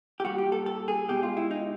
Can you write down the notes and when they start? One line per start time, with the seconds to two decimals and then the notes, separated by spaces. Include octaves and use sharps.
0.20 G4
0.24 A#2 G3 F#4
0.38 G4
0.52 A4
0.66 A4
0.88 G#4
1.08 B2 G#3 G4
1.23 F4
1.37 E4
1.51 D#4